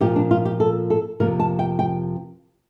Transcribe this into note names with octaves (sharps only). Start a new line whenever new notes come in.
A#2 F3 A#3 G4
D4
F4
G4
A4
A4
F2 C3 F3 A#3 A#4
A5
G5
G5